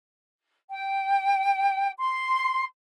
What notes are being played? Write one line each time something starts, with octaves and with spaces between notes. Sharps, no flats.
G5
C6